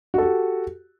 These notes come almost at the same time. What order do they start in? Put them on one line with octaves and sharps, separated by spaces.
F#4 A4 G4